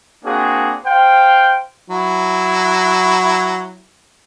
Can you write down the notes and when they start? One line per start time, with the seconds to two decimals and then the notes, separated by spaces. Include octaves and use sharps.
0.24 A#3 C4 D4 F#4 G#4
0.85 C5 F5 G5
1.90 F#3 E4